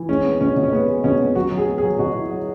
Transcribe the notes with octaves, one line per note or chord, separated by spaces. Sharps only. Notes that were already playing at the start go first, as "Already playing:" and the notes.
Already playing: E3
G#3 C#4
B3
B2 C#4
B2
C#4
G#3 B3
G#3
B2 C#4
B3
F#3 F#4
F#3
G#4
B3
G#4
F#3
B2 F#4
E4
F#3